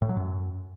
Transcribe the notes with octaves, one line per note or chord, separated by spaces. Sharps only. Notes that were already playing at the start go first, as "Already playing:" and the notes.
A2
F#3
F#2